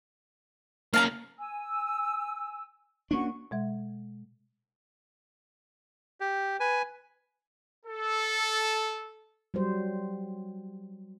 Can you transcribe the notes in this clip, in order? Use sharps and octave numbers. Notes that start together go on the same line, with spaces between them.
A#3 C#4 F5 A5 A#5
G#5 E6
A#3 C#4 D4 F#4 C#6
B2 G#3 E5
G4
B4 G#5
A4
F#3 G3 C5